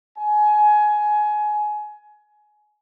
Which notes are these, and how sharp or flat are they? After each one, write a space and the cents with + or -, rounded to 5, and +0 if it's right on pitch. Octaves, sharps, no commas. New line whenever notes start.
G#5 +20